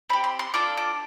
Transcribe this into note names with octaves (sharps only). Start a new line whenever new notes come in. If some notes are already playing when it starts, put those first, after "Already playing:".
C4 G4 B5
C6
C6
D4 F4 A4 D6
D6